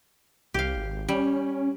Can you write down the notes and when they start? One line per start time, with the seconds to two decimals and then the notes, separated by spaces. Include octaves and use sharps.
0.54 C2 G4 F5
0.76 G#1
1.09 G3 C#4